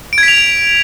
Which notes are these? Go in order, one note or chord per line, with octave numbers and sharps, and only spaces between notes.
D7
G#6
B6
F7